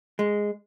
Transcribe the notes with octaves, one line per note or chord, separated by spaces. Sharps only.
G#3